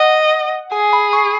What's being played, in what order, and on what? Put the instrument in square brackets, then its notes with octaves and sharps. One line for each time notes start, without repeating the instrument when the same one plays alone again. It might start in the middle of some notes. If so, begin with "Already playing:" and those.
Already playing: [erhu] D#5 [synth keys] F#5
[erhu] G#4 [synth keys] G#5
[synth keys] B5
C#6